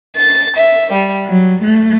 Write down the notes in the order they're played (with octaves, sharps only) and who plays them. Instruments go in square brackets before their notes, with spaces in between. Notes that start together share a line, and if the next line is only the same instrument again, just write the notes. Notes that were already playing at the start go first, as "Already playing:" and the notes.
[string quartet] A6
E5
G3
F#3
A3